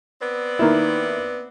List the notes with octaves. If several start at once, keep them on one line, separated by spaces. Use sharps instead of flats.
B3 C4 D5
D#3 A#3 E4